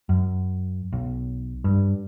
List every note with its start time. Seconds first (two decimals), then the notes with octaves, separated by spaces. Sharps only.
0.09 F#2
0.92 B1
1.64 G2